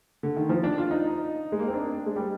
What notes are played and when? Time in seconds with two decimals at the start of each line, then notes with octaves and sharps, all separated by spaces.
0.23 D3
0.36 D#3
0.49 F3
0.64 D4
0.78 F4
0.91 D#4
1.52 G#3
1.59 A#3
1.68 C4
1.74 D4
2.06 G#3
2.16 G3